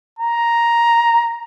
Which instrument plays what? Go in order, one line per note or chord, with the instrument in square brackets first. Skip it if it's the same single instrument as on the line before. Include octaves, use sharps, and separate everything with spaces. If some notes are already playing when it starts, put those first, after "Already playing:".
[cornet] A#5